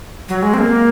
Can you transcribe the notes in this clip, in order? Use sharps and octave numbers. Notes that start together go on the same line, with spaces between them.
F#3
G#3
C4
A#3